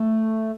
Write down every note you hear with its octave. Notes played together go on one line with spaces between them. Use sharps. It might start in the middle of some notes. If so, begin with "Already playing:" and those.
Already playing: A3